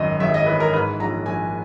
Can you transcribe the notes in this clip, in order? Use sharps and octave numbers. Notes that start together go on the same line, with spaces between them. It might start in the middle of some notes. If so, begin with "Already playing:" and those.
Already playing: G#1 F#2 D#5
G#1 E5
D#5
E3 B4
A#4
G#2 B4
A#1 A#5
A#1 G#5